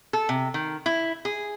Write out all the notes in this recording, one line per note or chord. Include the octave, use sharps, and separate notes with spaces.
A4
C3
D#3
E4
G#4